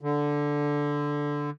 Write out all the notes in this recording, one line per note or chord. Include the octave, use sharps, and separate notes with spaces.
D3